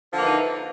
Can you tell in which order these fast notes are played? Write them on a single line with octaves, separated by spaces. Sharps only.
F3 D3 A#3 E3 D#4